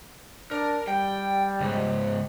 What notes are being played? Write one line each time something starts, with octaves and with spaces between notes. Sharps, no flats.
D4 A#4
G3 G5
C#2 G#2